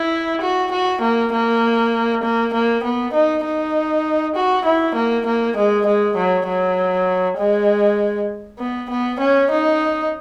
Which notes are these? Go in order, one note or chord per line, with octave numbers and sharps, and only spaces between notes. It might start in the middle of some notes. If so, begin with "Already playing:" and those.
Already playing: E4
F#4
F#4
A#3
A#3
A#3
A#3
B3
D#4
D#4
F#4
E4
A#3
A#3
G#3
G#3
F#3
F#3
G#3
B3
B3
C#4
D#4